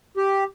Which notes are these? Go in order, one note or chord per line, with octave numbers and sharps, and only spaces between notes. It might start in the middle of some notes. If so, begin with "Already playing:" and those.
G4